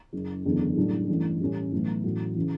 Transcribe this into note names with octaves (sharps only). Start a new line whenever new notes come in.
F#1 F#2 C#3
F#1 E2 D3
B1 A2 G3 D4
A1 G2 E3 A3
A1 A2 G3 C#4
B1 A2 E3 A3
A1 A2 F#3
C#3 E3